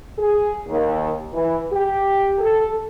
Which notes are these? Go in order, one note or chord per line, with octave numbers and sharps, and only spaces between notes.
G#4
D#2
E3
G4
A4